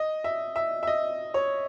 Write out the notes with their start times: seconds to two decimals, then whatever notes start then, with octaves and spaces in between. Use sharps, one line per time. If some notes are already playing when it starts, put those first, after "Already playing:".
Already playing: D#5
0.24 E5
0.56 E5
0.83 E5
0.87 D#5
1.34 C#5